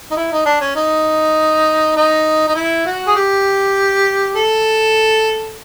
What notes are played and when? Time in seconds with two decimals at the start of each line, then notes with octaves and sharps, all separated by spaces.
0.11 D#4
0.16 E4
0.31 D#4
0.45 D4
0.60 C#4
0.76 D#4
1.96 D#4
2.48 D#4
2.55 E4
2.86 F#4
3.07 G#4
3.16 G4
4.36 A4